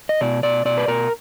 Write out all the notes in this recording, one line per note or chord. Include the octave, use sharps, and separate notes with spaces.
D#5
B2 D5
B2 D5
B2 D5
B4
B2 A#4